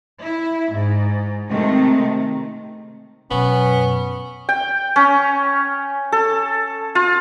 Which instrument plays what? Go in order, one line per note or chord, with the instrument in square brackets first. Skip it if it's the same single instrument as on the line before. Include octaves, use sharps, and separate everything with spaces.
[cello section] E4
G#2
C3 D#3 G#3 A3
[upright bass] F#2 B2 [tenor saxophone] B3 [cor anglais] C#4
[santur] G5
C#4
A4
F4